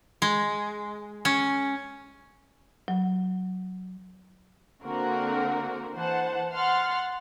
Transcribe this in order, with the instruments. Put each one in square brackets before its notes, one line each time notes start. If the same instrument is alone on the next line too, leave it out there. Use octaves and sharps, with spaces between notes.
[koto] G#3
C#4
[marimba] F#3
[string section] D3 A#3 C4 F#4 A#4
E3 C5 F#5 A5
F#5 C6 F6 A6